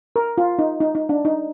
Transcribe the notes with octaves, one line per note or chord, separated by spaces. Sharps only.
A#4
F4
D#4
D#4
D#4
D4
D#4